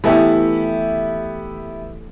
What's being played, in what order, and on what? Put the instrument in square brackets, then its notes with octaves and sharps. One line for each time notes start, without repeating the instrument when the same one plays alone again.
[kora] E3 A3 [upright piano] B3 E4 G4